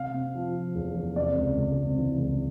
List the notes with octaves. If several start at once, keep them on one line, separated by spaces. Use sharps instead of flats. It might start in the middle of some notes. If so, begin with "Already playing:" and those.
Already playing: C3 F5
C3
F3
F3
E2
E2
C3 D5
C#2
C#2
C3
E3
C#2